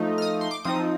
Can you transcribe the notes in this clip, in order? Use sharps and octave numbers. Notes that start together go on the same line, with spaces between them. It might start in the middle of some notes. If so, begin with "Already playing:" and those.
Already playing: F3 A3 D#4
F6
D#6
C6
D6
F3 C4 D#4 D#6